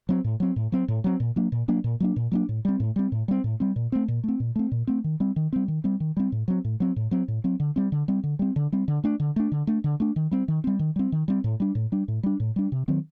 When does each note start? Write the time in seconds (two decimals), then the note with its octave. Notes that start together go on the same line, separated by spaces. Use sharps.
0.09 F#3 C4
0.24 A2
0.40 F#3 C4
0.56 A2
0.72 F#3 C4
0.88 A2
1.04 F#3 C4
1.20 A#2
1.36 F#3 A#3 D4
1.52 A#2
1.68 F#3 A#3 D4
1.84 A#2
2.00 F#3 A#3 D4
2.16 A#2
2.32 F#3 A#3 D4
2.49 A2
2.65 G3 C4
2.80 A2
2.96 G3 C4
3.12 A2
3.28 G3 C4
3.44 A2
3.60 G3 C4
3.76 A#2
3.92 A3 C4
4.08 A#2
4.24 A3 C4
4.40 A#2
4.56 A3 C4
4.72 A#2
4.87 A3 C4
5.04 D#3
5.20 G3 C4
5.36 D#3
5.53 G3 C4
5.68 D#3
5.84 G3 C4
6.00 D#3
6.17 G3 C4
6.32 A2
6.48 F#3 C4
6.65 A2
6.80 F#3 C4
6.96 A2
7.11 F#3 C4
7.28 A2
7.44 F#3 C4
7.60 D3
7.76 G3 C4
7.92 D3
8.08 G3 C4
8.24 D3
8.39 G3 C4
8.56 D3
8.72 G3 C4
8.88 D3
9.04 A3 D4
9.20 D3
9.36 A3 D4
9.52 D3
9.67 A3 D4
9.84 D3
10.00 A3 D4
10.16 D#3
10.31 G3 C4
10.48 D#3
10.64 G3 C4
10.79 D#3
10.96 G3 C4
11.12 D#3
11.28 G3 C4
11.44 A2
11.60 G3 D4
11.75 A2
11.92 G3 D4
12.08 A2
12.23 G3 D4
12.40 A2
12.56 G3 D4
12.72 C3
12.88 D#3 F#3 C4